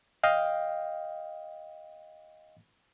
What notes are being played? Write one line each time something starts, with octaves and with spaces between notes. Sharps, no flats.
D#5 F5 G5